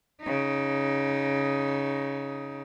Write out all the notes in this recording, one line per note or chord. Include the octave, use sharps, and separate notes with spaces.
C#3 D#4